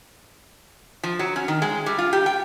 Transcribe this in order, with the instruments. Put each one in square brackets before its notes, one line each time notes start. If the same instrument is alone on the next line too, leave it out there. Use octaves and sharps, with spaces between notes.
[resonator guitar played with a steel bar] F3
F#3
C#4
D#3
G#3
G3
F4
G4
G5